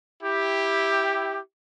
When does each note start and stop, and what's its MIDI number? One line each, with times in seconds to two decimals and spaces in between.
0.24 1.39 64
0.24 1.39 67